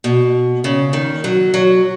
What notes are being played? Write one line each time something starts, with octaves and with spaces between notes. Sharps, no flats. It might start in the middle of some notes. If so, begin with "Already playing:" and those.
B2
C#3
D#3
F#3
F#3